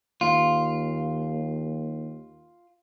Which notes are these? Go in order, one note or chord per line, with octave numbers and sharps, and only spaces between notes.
D#2 F4